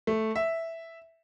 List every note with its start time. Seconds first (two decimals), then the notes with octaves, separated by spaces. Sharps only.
0.07 A3
0.36 E5